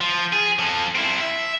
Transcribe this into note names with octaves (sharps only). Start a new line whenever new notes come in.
F3
G#4
F3 A4
C4 E4
E5